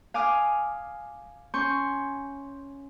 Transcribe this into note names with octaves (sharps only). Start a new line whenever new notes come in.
F5 G#5 D6 D#6 F6
C#4 C6 C#6 G6